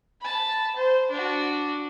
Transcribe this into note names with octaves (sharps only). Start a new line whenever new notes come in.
A5 B5
C5
D4 F#4